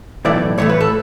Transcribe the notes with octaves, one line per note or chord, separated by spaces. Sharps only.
B1 A2 E3 A3 D5
A2 E3 A3 C#5
B4
A4